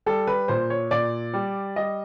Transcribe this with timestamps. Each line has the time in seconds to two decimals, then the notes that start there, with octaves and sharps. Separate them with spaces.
0.06 G3 A4
0.27 B4
0.48 A#2 C5
0.70 C#5
0.91 A#2 D5
1.33 G3
1.76 G3 D#5